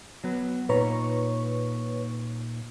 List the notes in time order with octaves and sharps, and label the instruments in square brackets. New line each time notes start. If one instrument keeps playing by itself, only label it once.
[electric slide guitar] F#3 B3 B4
[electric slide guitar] A#2 D#4 A#5 [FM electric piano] B4 C#5 C#6